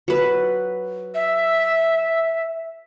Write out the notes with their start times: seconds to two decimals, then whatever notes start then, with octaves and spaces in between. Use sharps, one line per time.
0.08 F#3 B4
1.14 E5